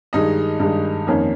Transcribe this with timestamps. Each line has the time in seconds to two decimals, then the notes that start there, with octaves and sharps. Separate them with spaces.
0.13 G2 D#3 G#3 D#4 D#5
0.60 G2 D#3 G#3
1.07 F2 D#3 A#3 C#4